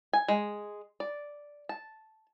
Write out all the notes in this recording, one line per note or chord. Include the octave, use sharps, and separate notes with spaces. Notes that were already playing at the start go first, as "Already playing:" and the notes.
G#5
G#3
D5
A5